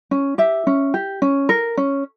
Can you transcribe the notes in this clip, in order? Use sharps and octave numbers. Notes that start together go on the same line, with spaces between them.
C#4
G4 E5
C#4
G4
C#4
A#4
C#4